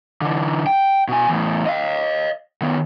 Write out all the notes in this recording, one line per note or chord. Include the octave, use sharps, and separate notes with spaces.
D3 E3
G5
B2 G#5
E2 A2
D#5 F5
D#3 B3